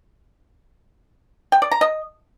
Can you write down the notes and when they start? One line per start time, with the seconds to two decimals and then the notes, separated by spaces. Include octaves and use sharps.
1.52 G5
1.62 D5
1.71 A#5
1.81 D#5